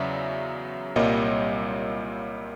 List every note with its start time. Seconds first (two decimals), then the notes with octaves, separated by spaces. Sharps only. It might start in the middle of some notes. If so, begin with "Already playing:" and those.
Already playing: E2 C#3 F#3 D5 E5
0.96 C2 A#2 G3 A#3 C#5 D#5